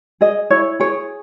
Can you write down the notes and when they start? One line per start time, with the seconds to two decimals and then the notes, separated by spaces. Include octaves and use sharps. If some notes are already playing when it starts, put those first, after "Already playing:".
0.21 G#4 D#5
0.50 E4 C#5
0.80 G#4 C#5